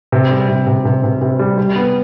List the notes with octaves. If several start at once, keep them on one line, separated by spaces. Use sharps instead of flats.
C3
G3
C3
C3
C3
C3
C3
G3
G3
B3